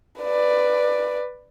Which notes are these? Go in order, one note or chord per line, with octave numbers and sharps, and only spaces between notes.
B4 D5